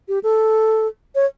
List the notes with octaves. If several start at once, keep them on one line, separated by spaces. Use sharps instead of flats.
G4
A4
C#5